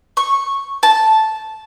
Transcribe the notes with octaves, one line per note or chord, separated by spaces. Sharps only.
C#6
A5